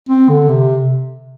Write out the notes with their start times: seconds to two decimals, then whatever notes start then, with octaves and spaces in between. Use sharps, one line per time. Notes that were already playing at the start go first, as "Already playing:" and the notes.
0.09 C4
0.29 D3
0.49 C3